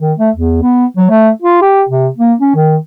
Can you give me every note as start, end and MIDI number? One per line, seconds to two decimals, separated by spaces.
0.01 0.13 51
0.18 0.30 57
0.36 0.58 40
0.62 0.86 59
0.97 1.09 54
1.10 1.30 57
1.42 1.61 65
1.62 1.84 67
1.89 2.08 48
2.17 2.34 58
2.40 2.52 61
2.55 2.76 51